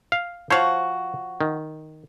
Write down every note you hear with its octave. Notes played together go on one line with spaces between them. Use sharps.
F5
F3 F#4 C5 C#5 F5
D#3